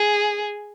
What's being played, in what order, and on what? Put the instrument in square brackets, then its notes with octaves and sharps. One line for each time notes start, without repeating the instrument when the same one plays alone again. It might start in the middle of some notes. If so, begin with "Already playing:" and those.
Already playing: [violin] G#4